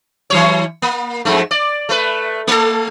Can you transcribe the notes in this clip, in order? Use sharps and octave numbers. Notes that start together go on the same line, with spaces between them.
E3 F#3 C#5
A#3
F2 G#2 A3
D5
A3 B4
A3 A4